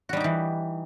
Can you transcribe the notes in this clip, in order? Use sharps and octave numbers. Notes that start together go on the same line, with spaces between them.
E3 G3 D#4 F#4 G4